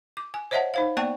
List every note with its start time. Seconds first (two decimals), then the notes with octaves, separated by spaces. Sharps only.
0.17 D6
0.34 G#5
0.51 C5 C#5 D#5 E5 F#5 A5
0.74 D#4 C5 F5
0.97 A#3 B3 D5 G5 A5 C#6